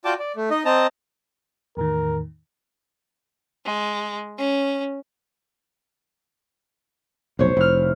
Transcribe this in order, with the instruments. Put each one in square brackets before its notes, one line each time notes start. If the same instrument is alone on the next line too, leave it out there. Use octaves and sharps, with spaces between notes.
[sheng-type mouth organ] F4 F#4 D5 G5 A5 D6
D5
A3
D#4 D#5
C4 D#5 A5 A#5
[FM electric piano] E2 A2 D#3 [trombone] A#4
[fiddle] G#3
C#4
[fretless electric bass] F1 B1 [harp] C5 C#5
[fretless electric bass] F1 [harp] E4 F6